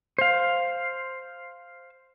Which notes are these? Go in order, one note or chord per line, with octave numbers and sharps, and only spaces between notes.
C5 F5